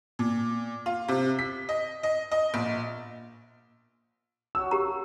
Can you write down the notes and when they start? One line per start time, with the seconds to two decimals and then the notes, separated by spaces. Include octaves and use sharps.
0.19 A#2
0.86 F4
1.08 C3
1.39 B6
1.69 D#5
2.03 D#5
2.32 D#5
2.54 A#1
4.55 F#3 C#4 F#4 E6
4.71 A#3 G4 A#5 D#6